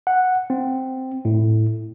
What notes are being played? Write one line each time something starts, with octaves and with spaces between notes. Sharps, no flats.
F#5
C4
A2